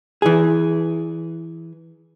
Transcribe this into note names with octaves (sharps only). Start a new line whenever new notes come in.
E3 G#4